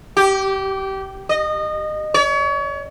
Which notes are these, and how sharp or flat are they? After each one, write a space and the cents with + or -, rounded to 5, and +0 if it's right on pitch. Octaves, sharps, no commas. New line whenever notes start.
G4 -20
D#5 -25
C#5 +35